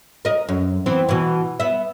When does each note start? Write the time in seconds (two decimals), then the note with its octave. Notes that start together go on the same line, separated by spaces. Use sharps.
0.25 A#4 D#5
0.49 F#2
0.86 E3 B3 C4
1.09 B2 E3
1.60 B3 E5